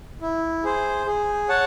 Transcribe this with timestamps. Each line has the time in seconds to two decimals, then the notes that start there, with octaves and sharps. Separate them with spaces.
0.21 E4
0.64 G#4 C5
1.06 G#4
1.49 C#5 F#5 A5